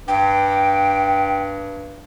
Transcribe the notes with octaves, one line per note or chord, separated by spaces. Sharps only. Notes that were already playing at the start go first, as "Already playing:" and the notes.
G2 G5